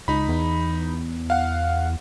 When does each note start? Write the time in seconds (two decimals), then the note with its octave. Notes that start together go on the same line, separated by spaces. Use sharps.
0.08 C#2 D#4 B5
0.28 E2
1.30 F5 F#5